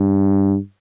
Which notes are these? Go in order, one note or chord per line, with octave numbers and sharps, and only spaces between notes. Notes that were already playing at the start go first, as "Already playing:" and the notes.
Already playing: G2